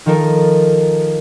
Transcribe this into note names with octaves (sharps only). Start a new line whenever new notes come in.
D#3 F3 D#4 A4 A#4